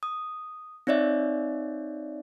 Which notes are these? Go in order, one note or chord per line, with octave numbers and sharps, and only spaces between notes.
D#6
C4 D#4 C#5 D5 E5